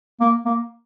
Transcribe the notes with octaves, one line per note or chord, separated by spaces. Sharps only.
A#3
A#3